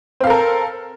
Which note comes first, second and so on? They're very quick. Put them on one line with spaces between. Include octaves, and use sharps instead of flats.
C4 F5 A4 A#4